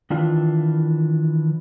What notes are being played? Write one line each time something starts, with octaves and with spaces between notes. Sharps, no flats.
D#3 E3 D4 F4